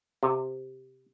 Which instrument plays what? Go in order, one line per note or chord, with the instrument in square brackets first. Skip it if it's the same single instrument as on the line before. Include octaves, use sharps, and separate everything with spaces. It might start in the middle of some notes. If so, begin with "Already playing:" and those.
[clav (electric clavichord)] C3